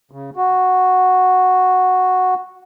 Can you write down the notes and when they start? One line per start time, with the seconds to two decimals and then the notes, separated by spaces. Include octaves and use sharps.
0.11 C#3
0.36 F#4